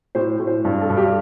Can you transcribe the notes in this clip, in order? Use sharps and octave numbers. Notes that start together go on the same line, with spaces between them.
A2 C5
A2
C5
G2
A4
G2
G4